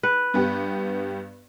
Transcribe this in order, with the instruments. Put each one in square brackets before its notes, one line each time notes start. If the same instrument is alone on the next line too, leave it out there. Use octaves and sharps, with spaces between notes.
[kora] B4
[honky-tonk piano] G2 B3 G4